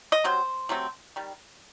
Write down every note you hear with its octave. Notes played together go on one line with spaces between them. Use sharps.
D#5
C3 F#3 C5
C3 F#3 A3 C4
D#3 G3